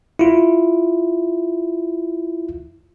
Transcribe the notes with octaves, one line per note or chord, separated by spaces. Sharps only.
E4 F4